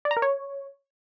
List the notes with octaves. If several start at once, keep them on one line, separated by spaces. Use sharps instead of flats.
D5
A#5
A#4
C#5